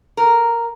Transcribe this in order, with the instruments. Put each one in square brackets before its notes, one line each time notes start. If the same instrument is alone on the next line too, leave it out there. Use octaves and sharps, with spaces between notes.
[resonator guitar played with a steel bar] A#4